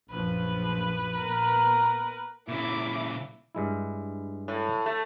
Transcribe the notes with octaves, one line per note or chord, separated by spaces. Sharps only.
A#1 F#2 F3 B4
A#2 B3 A#4
A#2 C#3 E4 D6
G2 G#3 E4
A2
A3